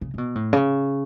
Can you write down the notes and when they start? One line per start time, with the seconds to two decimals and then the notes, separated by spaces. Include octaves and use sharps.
0.01 C#3
0.14 C#3
0.18 B2
0.35 A2
0.53 C#3